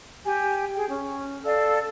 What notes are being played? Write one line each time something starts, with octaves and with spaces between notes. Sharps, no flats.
G4 G#5
G#4 G5
C#4
A4 D5 F5